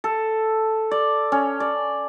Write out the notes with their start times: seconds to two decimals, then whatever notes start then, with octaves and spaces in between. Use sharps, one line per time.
0.04 A4
0.91 D5
1.32 C#4
1.60 D5